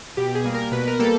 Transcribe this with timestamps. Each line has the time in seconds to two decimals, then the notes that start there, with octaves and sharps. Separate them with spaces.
0.17 B2 G4
0.28 G4
0.35 G#4
0.44 G3 A#3
0.54 A#4
0.72 B2 B4
0.87 A#4
0.99 G3 A#3 A4